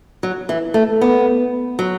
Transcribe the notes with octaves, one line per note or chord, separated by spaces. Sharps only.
F#3
E3
A3
B3
F#3